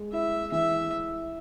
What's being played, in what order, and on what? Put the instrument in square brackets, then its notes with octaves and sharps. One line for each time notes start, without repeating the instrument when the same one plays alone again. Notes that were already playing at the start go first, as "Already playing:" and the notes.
Already playing: [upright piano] G#3
[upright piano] E4 [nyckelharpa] E5
[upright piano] E3 [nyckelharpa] E5